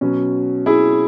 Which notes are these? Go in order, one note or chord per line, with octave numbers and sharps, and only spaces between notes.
B2 F#3 C#4
E4 G#4